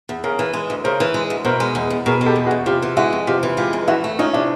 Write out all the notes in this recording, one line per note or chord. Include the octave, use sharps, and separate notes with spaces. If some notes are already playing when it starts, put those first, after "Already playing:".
E2
C#3 G#4 A#4
E3
G#3
D2
C#3 A#4 C5
E3
G#3
D2
B2 A#4 C5
G#3
E2
E2
B2 G#4 A#4
G#3
G4 A4
E2
F#4 G#4
E2
C3 F4 G4
E3
G#3 E4 F#4
F2
C3 F4 G4
E3
G#3 F4 G4
F2
E3 E4 F#4
A3
C#4 D#4 F4
C3 D4 E4